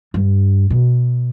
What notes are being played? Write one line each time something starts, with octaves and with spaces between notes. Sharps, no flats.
G2
B2